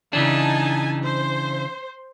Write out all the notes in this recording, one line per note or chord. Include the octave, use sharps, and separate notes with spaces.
C#3 E3 D4 D#4 G#5 A5
C5